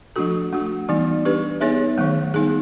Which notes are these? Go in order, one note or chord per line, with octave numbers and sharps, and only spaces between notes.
F3 A3 D4 F#4 A4
A3 D4 F#4
E3 G3 B3 D#4
D4 G4 B4
B3 D#4 G#4 C#5 E5
D#3 F#3 A3
G3 B3 D#4 G#4